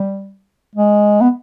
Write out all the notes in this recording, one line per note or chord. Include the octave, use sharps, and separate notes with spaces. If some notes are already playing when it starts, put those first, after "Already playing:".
Already playing: G3
G#3
B3